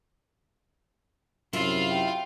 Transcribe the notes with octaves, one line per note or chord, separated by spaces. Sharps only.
F#2 C3 E4 F4 E5 F5
G5